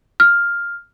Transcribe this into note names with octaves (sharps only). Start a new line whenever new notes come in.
F6